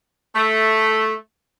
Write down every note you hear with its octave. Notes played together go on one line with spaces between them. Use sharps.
A3